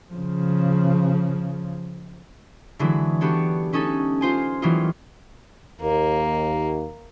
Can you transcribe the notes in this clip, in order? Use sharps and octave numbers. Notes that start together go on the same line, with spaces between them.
C#3 F3
D3 E3 F#3 G#3 E4
B3 D4 F#4 G4 A4 C#5
A3 C#4 D#4 A4
F4 C5 G#5
E3 F#3 G3 A#3 D#4 F4
D#2 A#3